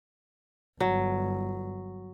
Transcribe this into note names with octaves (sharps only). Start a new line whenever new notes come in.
G1 F#3